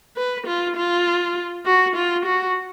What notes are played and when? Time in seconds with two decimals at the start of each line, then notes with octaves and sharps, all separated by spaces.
0.17 B4
0.47 F4
0.76 F4
1.66 F#4
1.96 F4
2.25 F#4